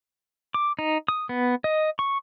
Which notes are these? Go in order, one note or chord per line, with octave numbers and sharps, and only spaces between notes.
D6
D#4
D#6
B3
D#5
C#6